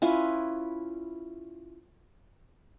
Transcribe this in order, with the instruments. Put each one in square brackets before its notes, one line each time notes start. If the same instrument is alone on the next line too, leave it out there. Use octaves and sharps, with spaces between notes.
[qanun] C#4 E4 F4 B4